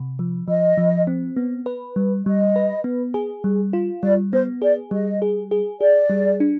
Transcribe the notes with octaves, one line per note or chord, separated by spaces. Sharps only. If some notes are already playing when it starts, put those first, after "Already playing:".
Already playing: C3
F3
F3 D#5
F3
C4
B3
B4
G3
G3 D#5
B4
B3
G#4
G3
F4
G3 D5
B3 C5
G#4 D5
G3 D#5
G#4
G#4
G#4 D5
G3
D4